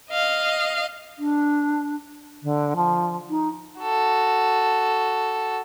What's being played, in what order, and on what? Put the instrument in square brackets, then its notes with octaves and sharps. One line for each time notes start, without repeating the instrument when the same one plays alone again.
[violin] D#5 F5
[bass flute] D4
D3
F3
D#4
[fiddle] F#4 A4